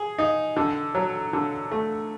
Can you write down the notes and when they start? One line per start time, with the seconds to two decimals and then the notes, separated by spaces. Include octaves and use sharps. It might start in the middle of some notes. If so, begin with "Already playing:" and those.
Already playing: G#4
0.18 D#4
0.56 D3
0.95 F#3
1.33 D3
1.71 A3